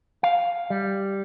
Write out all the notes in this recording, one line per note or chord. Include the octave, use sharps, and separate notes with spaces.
F5
G3